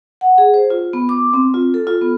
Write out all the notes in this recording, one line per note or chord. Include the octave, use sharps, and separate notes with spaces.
F#5
G#4
C5
F4
B3
D6
C4
F4
A4
F4
B3